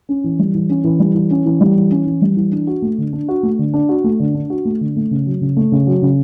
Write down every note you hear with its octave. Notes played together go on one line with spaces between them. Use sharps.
C#4
E3
G3
E3
C#4
E3
G3
E3
C#4
E3
G3
E3
C#4
E3
G3
E3
D4
F#4
A3
D3
D4
F#4
A3
D3
D4
F#4
A3
D3
D4
F#4
A3
D3
A3
C#3
F#3
C#3
A3
C#3
F#3
C#3